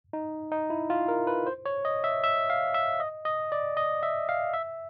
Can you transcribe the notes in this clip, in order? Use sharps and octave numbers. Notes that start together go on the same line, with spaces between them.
D#4
D#4
E4
F4
A#4
B4
C5
C#5
D#5
E5
E5
F5
E5
D#5
D#5
D5
D#5
E5
F5
E5